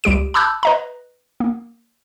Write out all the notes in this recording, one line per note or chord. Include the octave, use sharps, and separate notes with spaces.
C#2 G3 G4 D7
A5 B5 D6 E6 F#6 G6
B4 D#5 A#5
A#3